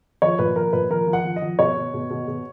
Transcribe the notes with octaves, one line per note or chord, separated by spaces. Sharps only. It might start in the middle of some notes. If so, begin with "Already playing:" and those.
F3 C#5
A#2 B4
F3 A#4
A#2 B4
F3 A#4
F3
F#5
F3
D#5
F3
B2 C#5
B2
B2
B2
B2